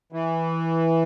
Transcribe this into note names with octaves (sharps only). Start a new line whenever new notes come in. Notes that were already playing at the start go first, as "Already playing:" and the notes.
E3